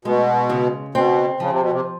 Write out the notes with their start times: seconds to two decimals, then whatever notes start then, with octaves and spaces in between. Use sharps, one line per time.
0.05 B2 G#3
0.50 C#3
0.95 B2 C4
1.40 C#3 F3
1.51 C3
1.61 B2
1.71 C3